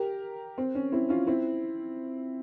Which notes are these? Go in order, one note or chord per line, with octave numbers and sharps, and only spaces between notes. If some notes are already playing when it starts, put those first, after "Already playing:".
Already playing: G4 A#4
C4
C#4
C4 E4
C#4 F4
C4 E4